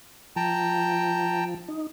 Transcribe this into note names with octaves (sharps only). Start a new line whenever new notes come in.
F3 G5 A5 A#5
D#4